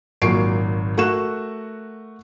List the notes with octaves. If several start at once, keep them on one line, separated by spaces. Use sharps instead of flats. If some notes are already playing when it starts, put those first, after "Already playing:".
G#1 A#2 F#3 C#6 C7 D7
A3 F#4 A#4 C#6 F#6 E7